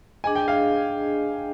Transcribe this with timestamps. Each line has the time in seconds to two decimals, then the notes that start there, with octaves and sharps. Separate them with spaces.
0.24 D4 G#4 D#5 G#5
0.35 G5
0.48 F5